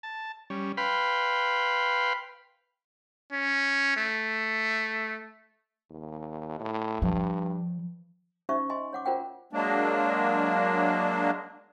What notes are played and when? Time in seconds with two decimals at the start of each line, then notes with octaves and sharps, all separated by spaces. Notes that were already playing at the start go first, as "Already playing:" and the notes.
0.03 A5
0.50 G3 C#4
0.77 B4 F5 G5 B5 C6
3.32 C#4
3.97 A3
5.90 D#2
6.60 A2
7.02 G2 F3
8.49 C#4 D#4 C5 D5 E5 C#6
8.70 D#5 G#5 C6
8.93 C#5 F#5 D6
9.06 F4 A#4 C5 D5 F#5 G5
9.53 F#3 G#3 A#3 D4